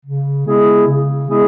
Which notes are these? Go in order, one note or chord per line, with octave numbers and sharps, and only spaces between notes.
C#3
G#3 B3 E4 G#4
C#3
G#3 B3 E4 G#4